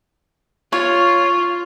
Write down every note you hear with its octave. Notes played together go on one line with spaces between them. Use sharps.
F4 C#5